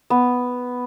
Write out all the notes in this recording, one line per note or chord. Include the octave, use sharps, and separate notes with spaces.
B3